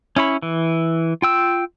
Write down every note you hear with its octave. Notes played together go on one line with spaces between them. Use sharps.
C#4 E4 C#5 B5
E3
F4 G5 E6